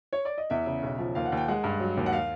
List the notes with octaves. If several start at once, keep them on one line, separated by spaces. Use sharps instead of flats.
C#5
D5
D#5
E2 E5
C#3
B1
F3
D#2 F5
F#5
D#2
G5
G#3 F#5
G2
F#3
D#2
F#5
F5